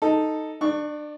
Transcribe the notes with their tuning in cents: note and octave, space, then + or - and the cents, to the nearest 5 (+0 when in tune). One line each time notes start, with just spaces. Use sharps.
D#4 +0 A4 +0
D4 +30 D5 +0 C#6 +0